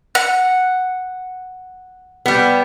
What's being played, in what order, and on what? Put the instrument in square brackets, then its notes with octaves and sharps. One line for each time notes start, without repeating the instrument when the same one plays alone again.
[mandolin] F#5
[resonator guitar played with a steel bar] G3 B3